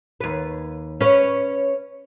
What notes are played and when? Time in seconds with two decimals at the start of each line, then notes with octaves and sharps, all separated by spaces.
0.20 D#2 B4
1.01 C#4 B4